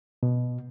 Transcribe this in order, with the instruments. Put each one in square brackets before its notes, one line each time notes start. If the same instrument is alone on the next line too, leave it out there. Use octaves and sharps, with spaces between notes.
[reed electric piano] B2